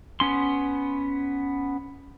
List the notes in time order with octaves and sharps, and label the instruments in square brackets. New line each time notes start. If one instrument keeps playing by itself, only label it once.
[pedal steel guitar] B3 C#4 C6